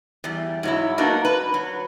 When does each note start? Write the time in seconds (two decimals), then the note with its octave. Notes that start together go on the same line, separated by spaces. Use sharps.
0.24 E2 G3
0.63 G#2 F#3 E4
0.98 A#3 B3 D4 D#4 F#4 A#4
1.25 B4
1.54 F#3